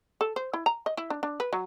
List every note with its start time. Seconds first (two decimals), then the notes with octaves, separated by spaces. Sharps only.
0.21 A4
0.36 C5
0.53 E4
0.66 A#5
0.86 D#5
0.97 E4
1.10 D4
1.23 D4
1.40 B4
1.53 F#3